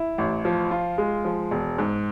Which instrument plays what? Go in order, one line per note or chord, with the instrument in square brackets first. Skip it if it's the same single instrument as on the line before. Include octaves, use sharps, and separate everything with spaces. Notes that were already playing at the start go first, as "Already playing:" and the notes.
Already playing: [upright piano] E4
A1
F3
F4
G#3
F3
E1
G#2